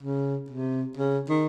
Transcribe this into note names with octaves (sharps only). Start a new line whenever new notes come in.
C#3
C3
C#3
D#3